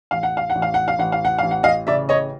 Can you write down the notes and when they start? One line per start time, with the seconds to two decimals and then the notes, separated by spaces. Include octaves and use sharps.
0.11 A1 F5
0.23 F#5
0.37 F5
0.50 F#5
0.55 A1
0.62 F5
0.74 F#5
0.88 F5
0.99 A1 F#5
1.12 F5
1.25 F#5
1.38 A1 F5
1.51 F#5
1.63 D#5 F5
1.87 C#3 D5 E5
2.09 C#5 D#5